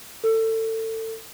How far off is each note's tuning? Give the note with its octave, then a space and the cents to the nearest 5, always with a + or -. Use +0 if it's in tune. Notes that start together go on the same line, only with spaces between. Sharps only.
A4 +25